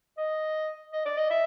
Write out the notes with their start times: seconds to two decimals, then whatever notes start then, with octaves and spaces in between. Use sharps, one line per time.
0.18 D#5
0.93 D#5
1.06 D5
1.18 D#5
1.31 E5